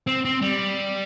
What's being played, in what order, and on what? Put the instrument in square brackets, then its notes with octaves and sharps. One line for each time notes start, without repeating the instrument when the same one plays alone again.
[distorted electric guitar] C4
C4
G3